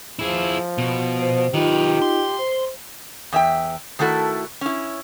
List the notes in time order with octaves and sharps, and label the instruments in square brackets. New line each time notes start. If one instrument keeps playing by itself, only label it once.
[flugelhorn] F3 [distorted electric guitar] E4 G#4
[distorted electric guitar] B2
[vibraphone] C5
[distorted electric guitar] D#3 B4 [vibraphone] D#4 F4 D#5 [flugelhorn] G4
[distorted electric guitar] C6
[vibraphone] C5
[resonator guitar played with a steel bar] E2 E5 G5
D#3 A3 E4 F#4 A4
C#4 E4